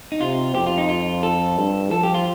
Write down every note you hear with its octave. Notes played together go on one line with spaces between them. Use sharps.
D#4
C3 F4
F2 G4
F4
D#4
F4
A4
G2
F3 A4
G4
F4